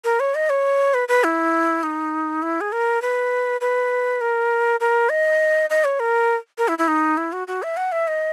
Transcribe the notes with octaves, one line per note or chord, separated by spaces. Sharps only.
A#4
C#5
D#5
C#5
B4
B4
E4
D#4
E4
G#4
A#4
B4
B4
A#4
A#4
D#5
D#5
C#5
A#4
A#4
E4
E4
D#4
E4
F#4
F#4
E5
F#5
E5
D#5